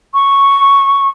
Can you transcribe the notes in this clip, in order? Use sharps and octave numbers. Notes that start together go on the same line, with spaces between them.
C#6